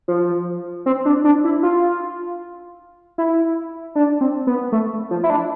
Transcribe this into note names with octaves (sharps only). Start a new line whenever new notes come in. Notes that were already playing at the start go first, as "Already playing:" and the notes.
F3
C4
D4
D4
E4
F4
E4
D4
C4
B3
A3
F3
E4
D4